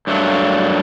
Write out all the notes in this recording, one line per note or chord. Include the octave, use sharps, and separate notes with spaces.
G2 F#3 A3